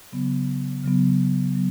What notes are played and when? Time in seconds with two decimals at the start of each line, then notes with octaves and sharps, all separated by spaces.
0.12 C#3 F#3 B3
0.84 C#3 F#3 B3
1.55 F#3 B3